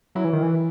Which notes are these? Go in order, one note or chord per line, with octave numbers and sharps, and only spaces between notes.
F#3 E4
E3
D#3
E3